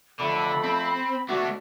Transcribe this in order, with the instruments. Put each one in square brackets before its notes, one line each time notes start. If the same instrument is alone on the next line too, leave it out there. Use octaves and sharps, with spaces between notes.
[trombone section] F2 A3 [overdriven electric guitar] D3 [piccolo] B5
[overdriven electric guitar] C4
[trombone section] B2 F#4 [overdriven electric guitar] A3 D4